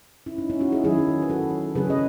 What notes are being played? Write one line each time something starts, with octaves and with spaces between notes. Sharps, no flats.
C#4 E4
D#4
C#4 E4
D#4 F#4
E4 G#4
D#3 F#3 C#4 E4 G#4
B4
F#4 A4
C#3 F#3 C#4 G#4 B4
D#5